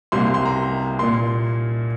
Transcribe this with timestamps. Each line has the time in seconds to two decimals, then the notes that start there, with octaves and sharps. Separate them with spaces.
0.12 C2 C3 A#3 C6
0.34 C6
0.45 A#5
0.99 A#2 A#3 C6